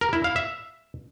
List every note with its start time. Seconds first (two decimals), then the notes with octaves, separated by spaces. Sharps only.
0.01 A#4
0.13 E4
0.24 F5
0.36 E5